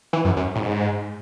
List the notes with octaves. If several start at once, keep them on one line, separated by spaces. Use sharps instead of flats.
E3
F#2
F#2
A2
G#2